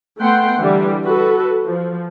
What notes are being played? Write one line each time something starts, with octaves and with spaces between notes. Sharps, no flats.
A3 B3 F#5 G5 C6
D3 E3 G3
F#4 A4 B4
F3